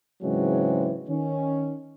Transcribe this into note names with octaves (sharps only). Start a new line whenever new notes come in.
G#2 C#3 E3 F#3 G#3 C4
D#3 C#4